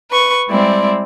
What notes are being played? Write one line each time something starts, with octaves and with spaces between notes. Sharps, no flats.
B4 C#6
G3 G#3 C4 E4 D5